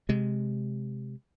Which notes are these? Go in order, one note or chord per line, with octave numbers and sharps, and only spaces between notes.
C3 G#3